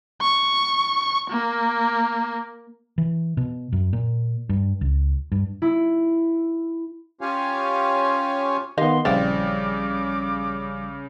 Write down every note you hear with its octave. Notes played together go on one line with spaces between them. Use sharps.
C#6
A#3
E3
B2
F#2
A#2
G2
C#2
G2
E4
C#4 F4 G4 C#5 F5 G#5
D#3 B3 G4 D#5 F5 C6
A#1 C#3 E3 G3 C4 F5 D6 A6